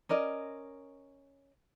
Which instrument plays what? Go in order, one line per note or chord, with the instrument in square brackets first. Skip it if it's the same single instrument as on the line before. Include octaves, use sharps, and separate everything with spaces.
[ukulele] C#4 A#4 D5 D#5